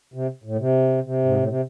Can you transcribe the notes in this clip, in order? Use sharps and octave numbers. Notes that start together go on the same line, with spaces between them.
C3
A2
C3
C3
G#2
A2
C3